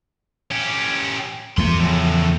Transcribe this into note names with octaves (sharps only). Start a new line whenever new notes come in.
C#4 G4
E2 F3 A3 G4 C6
A2 C#3